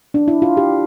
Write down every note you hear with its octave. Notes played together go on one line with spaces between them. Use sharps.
D4
E4
F4
G4